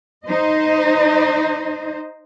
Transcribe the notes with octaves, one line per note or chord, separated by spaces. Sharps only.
D#4 C5 D#5